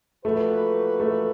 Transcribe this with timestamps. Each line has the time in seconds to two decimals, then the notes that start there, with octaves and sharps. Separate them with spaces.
0.24 F3 A3 A#3 D#4 F#4 B4
1.00 A3